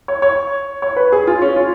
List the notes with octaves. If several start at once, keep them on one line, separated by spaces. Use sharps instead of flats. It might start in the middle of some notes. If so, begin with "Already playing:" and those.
C#5
C#5
C#5
B4
G#4
F4
C#4
F4